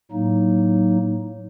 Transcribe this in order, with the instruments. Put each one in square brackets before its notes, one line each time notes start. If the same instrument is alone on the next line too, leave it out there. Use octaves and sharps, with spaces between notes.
[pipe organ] A2 F#3 A#3 D#4